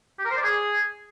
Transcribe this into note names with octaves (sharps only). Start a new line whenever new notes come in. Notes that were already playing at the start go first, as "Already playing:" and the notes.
G4
A#4
C5
D5
G#4